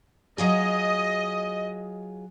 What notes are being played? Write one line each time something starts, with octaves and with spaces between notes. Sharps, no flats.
F#3 F4 G#4 D#5